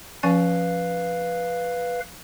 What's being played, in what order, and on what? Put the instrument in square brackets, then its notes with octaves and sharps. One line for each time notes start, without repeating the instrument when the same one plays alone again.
[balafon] F3 C#4 G#5 [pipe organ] B4 F5